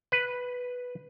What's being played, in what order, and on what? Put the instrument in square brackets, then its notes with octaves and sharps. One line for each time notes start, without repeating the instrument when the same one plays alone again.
[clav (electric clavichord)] B4